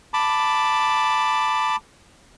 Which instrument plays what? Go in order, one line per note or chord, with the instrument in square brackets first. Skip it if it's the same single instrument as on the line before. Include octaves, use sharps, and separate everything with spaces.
[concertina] A5 B5 D6